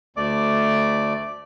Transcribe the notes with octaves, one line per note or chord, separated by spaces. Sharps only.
D2 A3 D5 D6